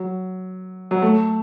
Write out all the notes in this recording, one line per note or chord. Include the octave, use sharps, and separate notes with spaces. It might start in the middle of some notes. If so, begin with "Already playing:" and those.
Already playing: F#3
F#3
A3